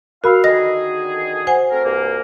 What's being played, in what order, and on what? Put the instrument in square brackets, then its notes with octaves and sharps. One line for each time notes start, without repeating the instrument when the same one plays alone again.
[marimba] F#4 [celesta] A#4 B5 E6 [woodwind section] F5
[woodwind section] D3 D#3 G#4 [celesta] D#5 [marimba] A#6
[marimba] C5 F#5 G#5
[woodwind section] A3 C4 A#4
C2 G2 A#3